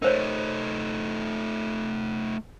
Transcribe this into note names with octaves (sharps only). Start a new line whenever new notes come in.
A3 D#4 A#4 C5 C#5